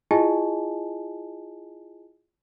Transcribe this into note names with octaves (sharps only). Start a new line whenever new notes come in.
E4 F4 G#4 D#5 G#5 A5